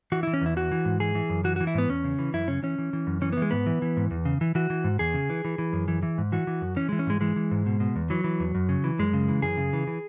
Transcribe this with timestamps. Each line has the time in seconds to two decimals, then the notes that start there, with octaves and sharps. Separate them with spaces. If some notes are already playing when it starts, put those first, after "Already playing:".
0.12 E3 F#4
0.23 E3 E4
0.34 C#4
0.42 E2 E4
0.56 E3 F#4
0.72 E3
0.85 G#2
1.00 E3 G#4
1.15 E3
1.30 F#2
1.44 E3 F#4
1.56 E3 F#4
1.67 E4
1.75 G#2 B3
1.89 E2 C#4
2.04 C#3
2.19 E3
2.33 F#2 E4
2.48 C#3 C#4
2.63 E3 C#4
2.78 E3
2.93 E3
3.07 F#2
3.22 E3 C#4
3.33 E3 B3
3.42 G#3
3.51 G#2 B3
3.66 E3
3.82 E3
3.97 G#2
4.11 E2
4.25 C#3
4.41 E3
4.55 E3 F#4
4.70 E3
4.84 G#2
4.99 E2 G#4
5.14 C#3
5.30 E3
5.45 E3
5.58 E3
5.73 F#2
5.88 E3
6.03 E3
6.18 G#2
6.32 E3 F#4
6.47 E3
6.62 F#2
6.76 E3 C#4
6.89 E3 G#3
6.99 C#4
7.07 G#2 G#3
7.21 E3 G#3
7.36 E3
7.51 G#2
7.66 B2
7.80 B2
7.96 E2
8.10 E3 F#3
8.24 E3
8.40 E2
8.55 F#2
8.69 C#3
8.84 E3
8.99 F#2 G#3
9.13 C#3
9.28 E3
9.42 F#2 G#4
9.57 C#3
9.73 E3
9.87 E3